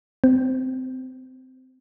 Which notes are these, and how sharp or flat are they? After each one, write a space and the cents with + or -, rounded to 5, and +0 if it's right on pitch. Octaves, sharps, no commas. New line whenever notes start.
C4 -20